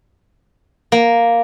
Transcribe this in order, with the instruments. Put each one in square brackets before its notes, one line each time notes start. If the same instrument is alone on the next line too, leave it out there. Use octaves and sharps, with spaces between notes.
[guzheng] A#3